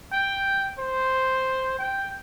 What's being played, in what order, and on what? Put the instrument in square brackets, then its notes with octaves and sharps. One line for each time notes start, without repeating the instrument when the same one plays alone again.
[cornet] G5
C5
G5